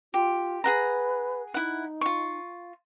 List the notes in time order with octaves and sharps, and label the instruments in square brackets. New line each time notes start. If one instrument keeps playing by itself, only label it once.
[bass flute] F4 [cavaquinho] G4
[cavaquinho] G#4 F#5 A#5 [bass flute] B4
[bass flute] D#4 [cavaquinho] E4 F#5
[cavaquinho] F4 C#6